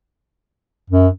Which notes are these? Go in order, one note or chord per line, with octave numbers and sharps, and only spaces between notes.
F#2